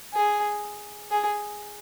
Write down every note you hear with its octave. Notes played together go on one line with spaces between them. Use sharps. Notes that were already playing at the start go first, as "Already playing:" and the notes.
G#4
G#4